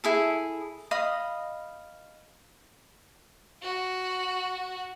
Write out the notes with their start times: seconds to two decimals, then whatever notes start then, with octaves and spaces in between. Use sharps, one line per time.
0.04 E4 G#4 A4
0.91 D#5 F5 B5 D#6
3.62 F#4